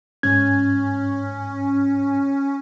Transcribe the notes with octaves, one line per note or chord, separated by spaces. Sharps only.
G#2 C#4 G#6